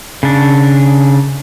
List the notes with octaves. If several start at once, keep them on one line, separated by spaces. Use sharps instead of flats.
C#3 D4